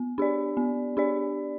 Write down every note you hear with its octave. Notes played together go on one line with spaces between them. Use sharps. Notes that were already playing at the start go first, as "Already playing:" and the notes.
Already playing: B3
D4 G4 D5
B3
D4 G4 D5